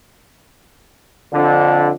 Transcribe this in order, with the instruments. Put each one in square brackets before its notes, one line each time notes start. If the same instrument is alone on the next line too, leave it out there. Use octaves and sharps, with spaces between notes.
[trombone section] F2 D3